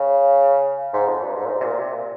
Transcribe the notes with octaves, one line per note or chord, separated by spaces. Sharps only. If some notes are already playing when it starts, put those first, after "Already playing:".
Already playing: C#3
G#2
F2
G2
G#2
A#2
G#2
C3
A#2
C3
A#2